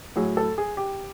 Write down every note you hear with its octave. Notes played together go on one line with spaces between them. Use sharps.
A2 F#3 G#4
A4
G#4
G4